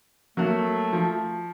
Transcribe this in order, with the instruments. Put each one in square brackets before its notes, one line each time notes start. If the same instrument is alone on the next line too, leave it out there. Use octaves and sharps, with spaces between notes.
[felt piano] F#3 A#3 F#4 [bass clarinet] A3
[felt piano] F3